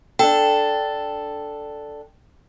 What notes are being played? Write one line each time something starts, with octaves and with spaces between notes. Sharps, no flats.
D4 A4 G5